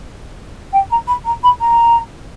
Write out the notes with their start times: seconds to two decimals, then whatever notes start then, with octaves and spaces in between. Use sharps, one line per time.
0.73 G5
0.90 A#5
1.07 B5
1.25 A#5
1.43 B5
1.60 A#5